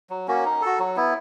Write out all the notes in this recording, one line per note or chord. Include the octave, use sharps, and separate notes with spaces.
F#3
A#3 C#4 F#4
D#4
F#4 A4
F#3
B3 E4